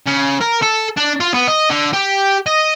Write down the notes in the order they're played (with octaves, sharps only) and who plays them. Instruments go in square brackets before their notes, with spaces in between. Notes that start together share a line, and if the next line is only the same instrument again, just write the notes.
[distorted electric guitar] C#3
A#4
A4
D4
F4
B3
D#5
D3
G4
D#5